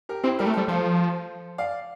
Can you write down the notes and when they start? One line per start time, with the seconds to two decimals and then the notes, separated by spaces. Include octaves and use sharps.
0.09 G4 A#4
0.23 C4 E4 G4
0.39 G3 G4 A#4
0.46 A3
0.53 G3 A4 C5
0.68 F3 A4 C5
1.58 D5 F5